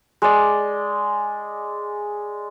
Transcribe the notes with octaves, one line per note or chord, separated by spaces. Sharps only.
G#3 D5